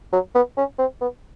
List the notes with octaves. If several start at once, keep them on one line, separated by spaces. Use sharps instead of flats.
F#3
B3
C#4
C4
B3